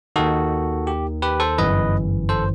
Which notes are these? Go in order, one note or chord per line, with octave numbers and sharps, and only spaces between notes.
D#2 D#3 F#4 A4
G4
G4 B4
A4 C5
G1 F#2 E3 B4 D#5
A4 C5